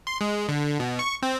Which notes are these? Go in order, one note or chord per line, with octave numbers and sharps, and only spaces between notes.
C6
G#3
D3
B2
C#6
C4